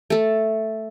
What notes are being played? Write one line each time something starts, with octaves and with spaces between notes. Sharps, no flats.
A3 A4